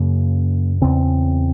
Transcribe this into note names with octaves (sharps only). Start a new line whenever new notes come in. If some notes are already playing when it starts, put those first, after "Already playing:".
Already playing: F#2 C#3 A#3
E2 C#3 C4